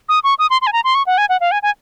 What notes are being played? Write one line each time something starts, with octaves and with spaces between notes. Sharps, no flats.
D#6
C#6
D#6
C6
C6
G#5
A#5
C6
C#6
F#5
G#5
F#5
F5
G#5
G#5